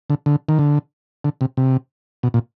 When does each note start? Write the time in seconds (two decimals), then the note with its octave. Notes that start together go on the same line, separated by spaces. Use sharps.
0.10 D3
0.26 D3
0.49 D#3
0.59 D3
1.24 D3
1.41 C3
1.57 C3
2.23 B2
2.34 A#2